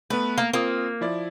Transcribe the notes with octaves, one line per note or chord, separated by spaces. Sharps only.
A3 B3 B4
A#3
A#3 C4 F4 D#6
F3 E4 D5